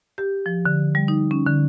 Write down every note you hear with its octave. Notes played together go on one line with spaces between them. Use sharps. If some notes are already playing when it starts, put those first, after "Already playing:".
G4
F3
D3
G3
D#4
C#4
D3